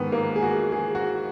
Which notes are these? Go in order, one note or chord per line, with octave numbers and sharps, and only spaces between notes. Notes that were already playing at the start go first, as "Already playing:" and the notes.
Already playing: G#2 D#3 B3
A#3
G#4
F#4
G#4
F#4